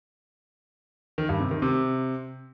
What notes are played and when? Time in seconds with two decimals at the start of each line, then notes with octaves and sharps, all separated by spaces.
1.18 D#3
1.29 G2
1.40 C3
1.51 D#3
1.62 C3